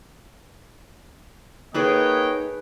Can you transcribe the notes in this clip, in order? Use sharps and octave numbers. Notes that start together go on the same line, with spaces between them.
A#3 D#4 G#4 A4 B4 C#5 D#5 G5